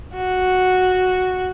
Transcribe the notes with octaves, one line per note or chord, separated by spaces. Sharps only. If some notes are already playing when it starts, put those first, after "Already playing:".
F#4